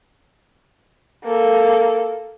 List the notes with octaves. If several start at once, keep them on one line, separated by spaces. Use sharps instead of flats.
A#3 A4